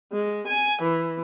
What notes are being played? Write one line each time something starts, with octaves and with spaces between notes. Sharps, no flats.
G#3
G#5
E3